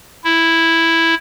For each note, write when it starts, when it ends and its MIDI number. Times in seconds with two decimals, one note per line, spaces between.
0.24 1.15 64